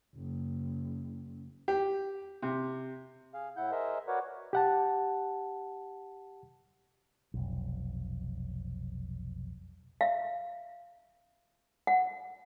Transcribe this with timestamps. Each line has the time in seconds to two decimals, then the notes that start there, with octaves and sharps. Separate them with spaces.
0.16 F#1
1.68 G4
2.42 C3
3.34 G#4 F5
3.57 A2 E4 F#5 G6
3.72 G#4 A#4 C5 D#5 E5
4.08 F#4 A#4 B4 C#5 D5 F#5
4.53 G4 F#5 A5
7.34 F1 B1
10.01 E5 F5
11.87 F#5